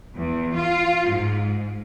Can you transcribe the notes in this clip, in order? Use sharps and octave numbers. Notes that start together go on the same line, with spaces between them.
E2
F4
G#2